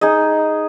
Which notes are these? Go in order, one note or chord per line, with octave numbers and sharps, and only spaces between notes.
D#4 G#4 D#5